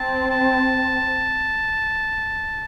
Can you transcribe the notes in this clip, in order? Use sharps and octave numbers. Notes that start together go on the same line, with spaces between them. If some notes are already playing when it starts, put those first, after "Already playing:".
Already playing: C4 A5
A5